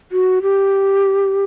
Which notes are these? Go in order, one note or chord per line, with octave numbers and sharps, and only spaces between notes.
F#4
G4